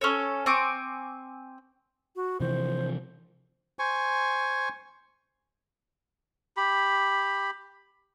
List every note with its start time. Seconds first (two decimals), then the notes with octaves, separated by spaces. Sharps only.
0.01 C#4 A4 C#5
0.46 C4 G#5 C#6 D6
2.16 F#4
2.40 C3 E3 F3 C5
3.79 C5 G#5 C#6
6.57 G4 B5